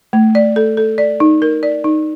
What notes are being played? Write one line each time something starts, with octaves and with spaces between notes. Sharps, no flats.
A3
D5
A4
A4
D5
D#4
A#4
D5
D#4